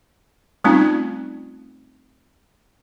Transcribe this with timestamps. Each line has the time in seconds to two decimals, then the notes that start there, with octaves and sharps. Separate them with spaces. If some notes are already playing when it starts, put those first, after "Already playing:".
0.64 G3 A3 C4 C#4 D#4 F4